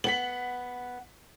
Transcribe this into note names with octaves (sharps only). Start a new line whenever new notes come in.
B3 F#5 B6 F#7